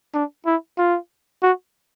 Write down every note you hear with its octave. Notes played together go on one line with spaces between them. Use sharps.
D4
E4
F4
F#4